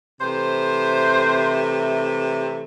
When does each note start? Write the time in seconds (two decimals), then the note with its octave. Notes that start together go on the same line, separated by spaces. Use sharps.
0.20 C3 E3 A3 C5